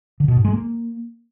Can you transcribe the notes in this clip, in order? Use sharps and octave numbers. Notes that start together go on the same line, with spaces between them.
D3
B2
G#2
G#3
A#3